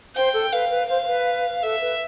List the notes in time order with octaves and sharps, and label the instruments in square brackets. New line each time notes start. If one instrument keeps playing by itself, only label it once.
[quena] C5 [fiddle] G5
[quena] A4
[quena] B4 [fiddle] F5
[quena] B4
[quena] C5 [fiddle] F5
[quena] C5
B4
[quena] A4 [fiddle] E5
[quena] B4